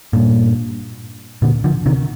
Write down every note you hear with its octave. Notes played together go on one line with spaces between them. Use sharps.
G2 A#2
A#2 D3
D3 F3
C3 D#3